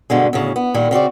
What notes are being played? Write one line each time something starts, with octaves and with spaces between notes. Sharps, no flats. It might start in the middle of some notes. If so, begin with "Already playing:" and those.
G2 B2 D3 G#3
D2 A2 C#3
B3
A#2 D#3 G3
C#3 C4 F#4 D5